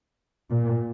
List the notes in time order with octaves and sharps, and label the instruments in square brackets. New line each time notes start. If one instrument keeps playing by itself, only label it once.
[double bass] A#2